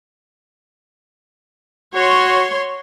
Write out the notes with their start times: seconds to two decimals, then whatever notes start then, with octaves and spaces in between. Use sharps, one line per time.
1.95 F#4 C#5 C6